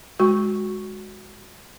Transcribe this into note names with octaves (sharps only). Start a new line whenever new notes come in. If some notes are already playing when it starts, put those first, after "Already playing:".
G#3 F#4 C#6